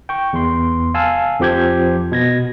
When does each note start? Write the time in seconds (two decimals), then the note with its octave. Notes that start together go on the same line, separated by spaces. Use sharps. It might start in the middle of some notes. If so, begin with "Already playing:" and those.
0.09 G5 C#6
0.33 E2 C6
0.94 F5 G#5 A5 E6
1.40 F2 F3 G4 G6 G#6
2.12 B2 G#6 A#6